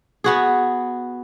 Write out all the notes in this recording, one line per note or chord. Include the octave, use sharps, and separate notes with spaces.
B3 F#4 G#4